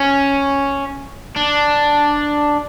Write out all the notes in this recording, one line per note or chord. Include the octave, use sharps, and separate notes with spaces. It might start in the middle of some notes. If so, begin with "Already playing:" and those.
Already playing: C#4
D4